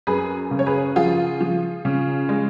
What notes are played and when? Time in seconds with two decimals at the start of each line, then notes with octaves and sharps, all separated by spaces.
0.07 F#2 G#4 B4
0.51 C#3
0.59 C#5
0.67 G#4 B4
0.96 F3 F4 G#4
1.41 F3
1.85 C#3
2.29 G#3